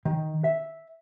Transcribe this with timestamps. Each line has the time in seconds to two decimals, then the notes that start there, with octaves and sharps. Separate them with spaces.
0.05 D#3
0.44 E5